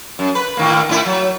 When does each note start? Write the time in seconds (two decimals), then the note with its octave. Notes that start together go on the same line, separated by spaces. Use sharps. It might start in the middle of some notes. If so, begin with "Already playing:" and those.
0.19 F#2
0.35 B4
0.57 A2 D#3 A#3
0.89 A2 E4
1.05 F#3